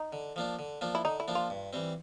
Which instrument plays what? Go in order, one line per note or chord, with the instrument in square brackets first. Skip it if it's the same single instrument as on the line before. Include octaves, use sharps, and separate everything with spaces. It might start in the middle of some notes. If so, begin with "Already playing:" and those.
Already playing: [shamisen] D#4
[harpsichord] D3
F3 A#3 D4
D3
F3 A#3 D4
[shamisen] E4
[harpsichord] D3 [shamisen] D#4
[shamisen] E4
[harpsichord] F3 A#3 D4
[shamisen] F4
[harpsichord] G2
E3 G3 C4